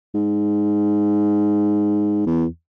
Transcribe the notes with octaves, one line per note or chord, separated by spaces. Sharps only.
G#2
E2